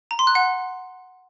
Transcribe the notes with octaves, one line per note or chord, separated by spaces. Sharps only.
A#5
C6
F#6
F#5